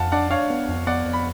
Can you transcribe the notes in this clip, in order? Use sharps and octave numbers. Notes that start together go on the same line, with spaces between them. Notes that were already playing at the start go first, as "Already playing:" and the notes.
Already playing: F2 F5 F#5 A5
D4 D5 F#5
D4 C#5 F5
B3
F2
B3 D5 F#5
F2
B5